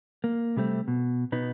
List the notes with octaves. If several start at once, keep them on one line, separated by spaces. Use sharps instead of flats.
A#3
C3 G3 A3 C4
B2
B2 B3 D#4